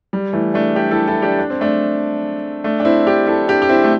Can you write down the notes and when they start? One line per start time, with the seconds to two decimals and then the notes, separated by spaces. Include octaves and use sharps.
0.13 G3
0.33 E3 A3
0.54 A3 D4
0.76 D4 G4
0.91 E4 A4
1.07 E4 A4
1.22 D4 G4
1.39 D4
1.50 C4
1.61 A3 D4
2.64 A3 D4
2.80 D4
2.85 C4 E4
3.06 D4 G4
3.27 E4 A4
3.48 D4 G4
3.62 G4
3.69 C4 E4
3.84 A3